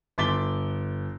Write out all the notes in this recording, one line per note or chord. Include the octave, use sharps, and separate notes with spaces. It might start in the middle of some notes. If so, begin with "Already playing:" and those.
G1 C6 D6 A6 B6 G7